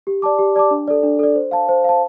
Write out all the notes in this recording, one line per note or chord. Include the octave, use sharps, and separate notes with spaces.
G4
D5 A5 D6
G4
D5 A5 D6
D4
A4 D5
D4
A4 D5
C5
F5 A5
C5
F5 A5